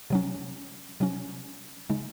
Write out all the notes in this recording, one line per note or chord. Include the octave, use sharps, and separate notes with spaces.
C3 F#3 C#4
C3 F#3 C#4
C#3 G#3 D#4